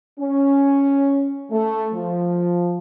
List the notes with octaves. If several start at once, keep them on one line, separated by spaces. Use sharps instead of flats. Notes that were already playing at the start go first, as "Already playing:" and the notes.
C#4
A3
F3